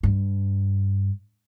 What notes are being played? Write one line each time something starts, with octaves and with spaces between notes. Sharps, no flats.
G2